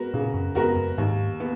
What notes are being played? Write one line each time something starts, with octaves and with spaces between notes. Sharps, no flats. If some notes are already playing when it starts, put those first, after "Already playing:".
Already playing: G#3 B3 F#4 A#4
A#2 C#3
F#2
F2 G#3 B3 F#4 A#4
F#2
D#2 G#2
B3